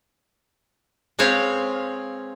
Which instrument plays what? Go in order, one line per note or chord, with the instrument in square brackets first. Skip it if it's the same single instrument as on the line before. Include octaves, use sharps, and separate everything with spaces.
[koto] G#3 C4 B4 C#5 F5